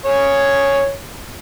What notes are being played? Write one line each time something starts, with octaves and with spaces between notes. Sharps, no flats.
G#4 C#5